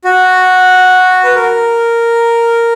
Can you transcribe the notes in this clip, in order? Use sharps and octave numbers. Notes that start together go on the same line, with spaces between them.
F#4
B4
A#4